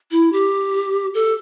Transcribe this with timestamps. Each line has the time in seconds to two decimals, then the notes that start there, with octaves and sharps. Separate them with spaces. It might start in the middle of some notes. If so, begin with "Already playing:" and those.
0.11 E4
0.33 G4
1.14 A4